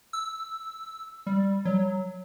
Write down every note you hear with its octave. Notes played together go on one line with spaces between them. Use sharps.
E6
G3
F#3